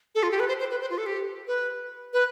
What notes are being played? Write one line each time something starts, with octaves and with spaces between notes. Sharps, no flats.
A4
F4
G4
B4
C5
C5
B4
C5
F4
A4
G4
B4
B4